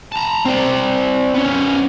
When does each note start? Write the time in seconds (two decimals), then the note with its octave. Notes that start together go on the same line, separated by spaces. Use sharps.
0.12 A5 A#5
0.45 C4 D5
1.34 B3 C#4